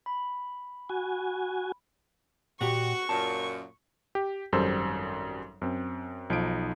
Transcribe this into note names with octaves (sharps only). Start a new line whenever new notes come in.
B5
F#4 G#5
A#2 F#4 G4 C#6
F#2 A#2 A5
G4
G#1 F#2 G3 A4 C5 E6
F#2 C4
B1 F3 D#4 D7